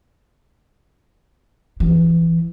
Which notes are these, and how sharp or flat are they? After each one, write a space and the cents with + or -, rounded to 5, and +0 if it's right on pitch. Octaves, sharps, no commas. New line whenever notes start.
E3 +20